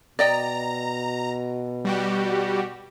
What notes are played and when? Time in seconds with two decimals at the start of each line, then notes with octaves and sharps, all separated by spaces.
0.19 B2 D5 D#5 G5 A#5
1.85 G3 F#4 G4